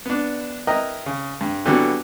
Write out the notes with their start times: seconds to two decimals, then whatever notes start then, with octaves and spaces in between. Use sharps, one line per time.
0.06 B3 D4
0.67 E4 A#4 B4 D#5 G5 A#5
1.06 C#3
1.41 G2
1.66 D3 E3 F#3 G3 B3 F#4